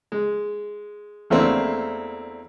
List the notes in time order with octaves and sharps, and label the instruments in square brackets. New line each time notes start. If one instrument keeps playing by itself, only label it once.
[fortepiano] G#3
E2 A3 A#3 C4 D4 E4